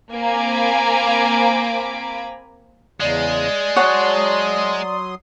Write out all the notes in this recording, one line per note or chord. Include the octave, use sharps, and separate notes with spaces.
A#3 C4 G#5 A#5 B5 D6
E2 C#3 G#3 D5
F#3 C#5 F#5 A5 C6 D#6